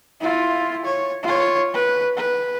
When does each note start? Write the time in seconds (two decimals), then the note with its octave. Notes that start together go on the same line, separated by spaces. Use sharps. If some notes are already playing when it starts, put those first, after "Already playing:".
0.21 E4 F4
0.85 C#5
1.23 F4 C#5
1.74 B4
2.17 B4